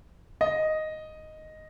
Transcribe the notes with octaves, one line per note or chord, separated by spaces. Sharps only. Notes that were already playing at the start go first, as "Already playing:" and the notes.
D#5